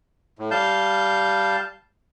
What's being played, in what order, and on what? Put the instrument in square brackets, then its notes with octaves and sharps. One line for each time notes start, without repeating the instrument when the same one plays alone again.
[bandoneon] A2
G3 F5 A5 G6